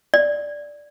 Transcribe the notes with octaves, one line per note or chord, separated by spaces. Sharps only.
D5